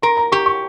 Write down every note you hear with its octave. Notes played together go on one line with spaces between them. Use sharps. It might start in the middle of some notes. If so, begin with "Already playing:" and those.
A#4 C6
A#5
G4 C#6
C#6